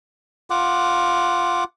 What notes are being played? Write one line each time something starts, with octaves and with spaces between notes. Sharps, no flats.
F4 F#5 D6